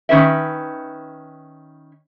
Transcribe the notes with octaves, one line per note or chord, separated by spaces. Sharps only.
D#3 C#4 B4 E5